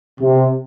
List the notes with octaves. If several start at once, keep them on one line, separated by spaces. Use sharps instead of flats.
C3